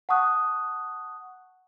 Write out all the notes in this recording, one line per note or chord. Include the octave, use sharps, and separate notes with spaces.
F#5 A5 C#6 D#6 F#6